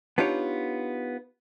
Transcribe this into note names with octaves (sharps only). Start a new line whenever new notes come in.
B3 D4 D#4 F4 G4 C#5